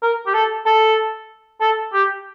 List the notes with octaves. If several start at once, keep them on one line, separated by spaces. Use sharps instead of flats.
A#4
G4
A4
A4
A4
G4